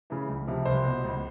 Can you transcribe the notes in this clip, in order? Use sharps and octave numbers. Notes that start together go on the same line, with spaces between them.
C#3 E3
C#2
C3 F3
C2 C5
B2
C#2